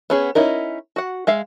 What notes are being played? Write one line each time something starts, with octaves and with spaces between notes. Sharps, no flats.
B3 C#4 G#4
C#4 D#4 E4 A#4
F#4 F#5
G#3 E5 F5